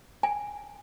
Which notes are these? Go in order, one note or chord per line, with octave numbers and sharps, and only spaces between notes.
G#5